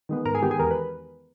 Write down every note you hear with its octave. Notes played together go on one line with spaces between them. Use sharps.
D#3 G#3 B3
G#2 A#4
G#4
D#3 G#3 B3 G4
G#4
E2 A#4
B4